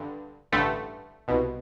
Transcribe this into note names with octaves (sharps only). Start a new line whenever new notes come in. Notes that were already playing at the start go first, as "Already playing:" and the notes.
Already playing: G2 D3
A1 G2 D3 A3
C2 B2